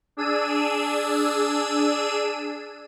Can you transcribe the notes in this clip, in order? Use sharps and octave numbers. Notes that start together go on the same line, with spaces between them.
D4 G#4 E6 D#7